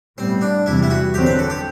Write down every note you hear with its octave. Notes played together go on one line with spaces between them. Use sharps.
A2 G3 B3 C4
D4
E2 C3 E3 G3 E4
E4
F#4
E2 D3 F#3 C4 G4
B4
A4
G4